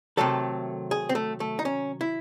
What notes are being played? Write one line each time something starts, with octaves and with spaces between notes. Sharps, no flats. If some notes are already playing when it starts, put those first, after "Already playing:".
C3 D#3 F#3 A3 A4
G#4
C4
A3
A3
D#4
C#4
E4